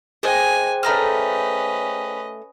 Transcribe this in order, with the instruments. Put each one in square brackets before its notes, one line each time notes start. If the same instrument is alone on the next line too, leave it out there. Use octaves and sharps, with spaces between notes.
[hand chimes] G#4 C5 G5 [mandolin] D#5 [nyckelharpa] G#5
[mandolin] A3 A#5 F6 [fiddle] C#4 B4 [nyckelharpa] D#5